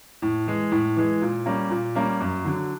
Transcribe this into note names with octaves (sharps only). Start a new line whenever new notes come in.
A2
E3 G#3
A2
E3 G#3
A#2
G3 A#3 C#4
A#2
G3 A#3 C#4
F#2
D3 F#3